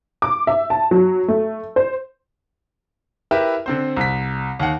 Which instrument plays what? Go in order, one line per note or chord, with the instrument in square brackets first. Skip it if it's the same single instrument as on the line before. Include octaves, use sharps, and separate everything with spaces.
[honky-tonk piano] D6
E5
A5
F#3
A3
C5
[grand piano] E4 G4 A#4 B4 E5
D3 C4 C5
C2 B6
D#2 F#5